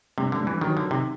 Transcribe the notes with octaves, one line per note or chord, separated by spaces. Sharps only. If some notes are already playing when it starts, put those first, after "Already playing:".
G2 C3
D3
G2
E3
D#3 F#3
D3
D#3
C3